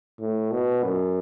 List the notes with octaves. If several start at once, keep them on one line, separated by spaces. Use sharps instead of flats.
A2
B2
F#2